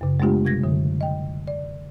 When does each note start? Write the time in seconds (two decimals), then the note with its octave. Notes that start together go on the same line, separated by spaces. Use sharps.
0.01 F#2 C#3
0.20 G#3 A3 B3 D4 F4 G4
0.45 C3 G3 G#6 A#6
0.63 F#2 D3 F#3
1.01 D#5 G5
1.48 D5